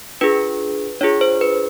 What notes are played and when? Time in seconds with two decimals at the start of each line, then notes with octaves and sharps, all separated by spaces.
0.21 D4 F4 G#4 B4
1.01 D4 F4 G#4 C#5
1.21 C5
1.41 B4